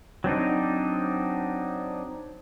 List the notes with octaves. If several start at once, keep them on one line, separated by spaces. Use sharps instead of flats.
F#3 C4 D4 D#4